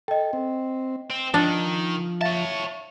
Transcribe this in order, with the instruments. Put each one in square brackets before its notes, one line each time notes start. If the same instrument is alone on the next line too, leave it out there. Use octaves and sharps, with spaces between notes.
[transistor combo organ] A4 [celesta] D#5 G5
[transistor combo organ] C4
[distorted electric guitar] C4
[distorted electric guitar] D#3 [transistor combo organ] F3 [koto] D4
[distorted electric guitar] C#5 A5 [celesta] E5 F5 A6